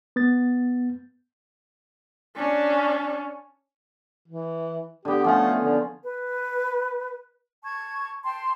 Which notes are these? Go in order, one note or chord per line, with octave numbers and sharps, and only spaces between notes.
B3 A6
C#4 D4
E3
D3 B3 G4
F3 A3 C#4 F4
D3
B4
A5 C#6 G#6
G5 A5 C6